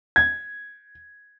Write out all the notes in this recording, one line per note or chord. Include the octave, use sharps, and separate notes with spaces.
G#6